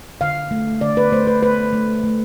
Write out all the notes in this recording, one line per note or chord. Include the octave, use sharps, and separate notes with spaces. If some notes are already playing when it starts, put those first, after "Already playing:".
D3 F5
A3
D3 D5
B4
A3 C5
B4
A3 B4
A3
A3